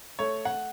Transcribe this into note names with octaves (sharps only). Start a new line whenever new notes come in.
A3 C#5
F#5